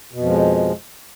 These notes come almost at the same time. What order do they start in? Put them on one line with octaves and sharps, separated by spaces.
B2 F2 F3 G#3